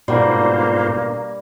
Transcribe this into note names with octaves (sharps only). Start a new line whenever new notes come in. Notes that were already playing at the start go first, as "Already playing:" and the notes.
G#2 B2 D3 G3 A#3 F4 C5